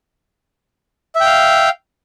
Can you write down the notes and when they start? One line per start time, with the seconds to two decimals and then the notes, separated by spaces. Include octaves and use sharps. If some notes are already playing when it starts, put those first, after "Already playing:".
1.15 E5
1.20 G5
1.25 F5